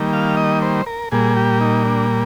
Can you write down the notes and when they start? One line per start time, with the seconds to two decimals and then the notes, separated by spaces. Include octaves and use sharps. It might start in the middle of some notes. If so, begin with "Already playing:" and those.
Already playing: D#3 G3 A#3
0.13 F5
0.37 D#5
0.62 C5
0.86 A#4
1.12 A#2 G3 A#3 G#4
1.37 G4
1.61 D#4
1.85 D4